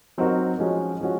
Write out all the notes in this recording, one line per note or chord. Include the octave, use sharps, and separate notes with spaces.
F#3 C4 D#4 F#4 A#4
F3 G#3 C#4 F#4
F3 G#3 C#4 F#4